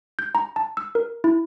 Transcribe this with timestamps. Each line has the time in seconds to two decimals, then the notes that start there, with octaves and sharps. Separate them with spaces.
0.19 G6
0.35 A#5
0.56 A5
0.77 E6
0.95 A#4
1.24 E4